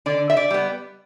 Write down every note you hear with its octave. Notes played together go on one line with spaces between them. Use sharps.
D3 D5
E5
D5
G3 B3